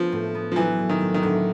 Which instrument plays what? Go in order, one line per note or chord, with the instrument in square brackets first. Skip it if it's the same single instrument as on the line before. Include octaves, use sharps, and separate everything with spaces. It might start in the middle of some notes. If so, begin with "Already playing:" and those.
Already playing: [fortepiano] F3 [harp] B3
[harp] A2
B3
[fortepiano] F3
[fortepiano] E3 [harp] F#3
[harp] A2
[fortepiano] D#3
[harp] A2
[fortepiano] D#3
[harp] A2 [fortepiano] D3